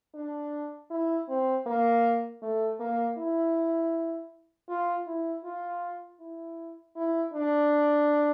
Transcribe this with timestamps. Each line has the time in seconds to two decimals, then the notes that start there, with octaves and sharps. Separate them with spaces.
0.15 D4
0.91 E4
1.28 C4
1.67 A#3
2.42 A3
2.80 A#3
3.18 E4
4.69 F4
5.07 E4
5.44 F4
6.20 E4
6.96 E4
7.34 D4